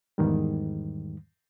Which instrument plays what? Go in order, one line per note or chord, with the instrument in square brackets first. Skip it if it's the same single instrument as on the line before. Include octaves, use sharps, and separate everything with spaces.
[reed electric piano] E2 G#2 D#3 G3